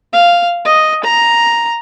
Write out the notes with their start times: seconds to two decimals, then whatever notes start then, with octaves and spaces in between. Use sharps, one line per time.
0.13 F5
0.65 D#5
1.04 A#5